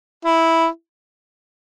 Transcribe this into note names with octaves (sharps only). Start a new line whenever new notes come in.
E4